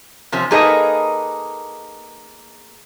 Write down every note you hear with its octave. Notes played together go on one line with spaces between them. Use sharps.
C3 F3 C#4
A#3 D#4 G#4 A4 B4 D#5